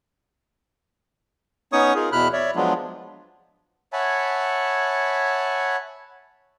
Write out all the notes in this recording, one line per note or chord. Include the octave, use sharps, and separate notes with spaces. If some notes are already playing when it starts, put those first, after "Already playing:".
B3 C#4 D#4 C#5 C#6 D#6
D#4 F4 G#4 A#4
E2 B2 E4 B5 F6 F#6
C#5 D5 E5
F3 F#3 G#3 B3 D4 F4
C#5 E5 F#5 G#5 A5 B5